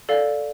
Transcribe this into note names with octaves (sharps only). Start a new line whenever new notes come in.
A4 D5 F5